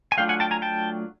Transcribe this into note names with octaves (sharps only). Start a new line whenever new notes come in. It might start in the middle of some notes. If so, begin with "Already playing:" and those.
G#5
F#3 A3 D4 F4 F5 G5
F#5 G#5
G5 A5
G#5 A#5
G5 A5